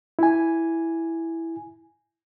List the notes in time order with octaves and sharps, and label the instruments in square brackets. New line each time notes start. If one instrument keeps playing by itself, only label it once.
[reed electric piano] E4 G#5